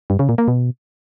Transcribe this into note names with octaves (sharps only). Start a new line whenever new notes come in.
G2
C#3
A#2
A#3
B2